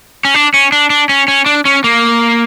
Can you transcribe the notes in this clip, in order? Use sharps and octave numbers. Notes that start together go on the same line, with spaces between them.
C#4
D4
C#4
D4
D4
C#4
C#4
D4
C#4
A#3